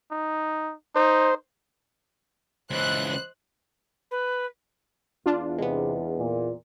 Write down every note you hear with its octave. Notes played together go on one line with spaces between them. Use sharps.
D#4
D#4 C5
C#2 E3 C5 D#5 F#6
B4
E2 D4 F4
C3 G#3 B3 C5
A#2